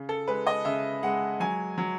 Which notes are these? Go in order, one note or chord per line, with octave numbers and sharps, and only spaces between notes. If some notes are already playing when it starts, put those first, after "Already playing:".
Already playing: C#3
A4
G#3 B4
D#5
C#3 E5
G#3 F#5
F#3 G#5
F#3